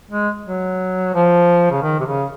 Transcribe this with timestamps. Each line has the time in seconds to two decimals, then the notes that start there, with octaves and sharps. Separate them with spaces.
0.11 G#3
0.45 F#3
1.14 F3
1.72 C#3
1.82 D#3
2.00 C3
2.06 C#3